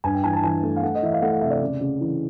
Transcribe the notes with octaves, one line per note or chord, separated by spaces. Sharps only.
G2 G#5
G5
E3 G#5
A5
E3 G#5
A3
F5
A3 F#5
D#5
E3 E5
F5
A3 F#5
F5
C3 E5
D5
C#3
C#3
E3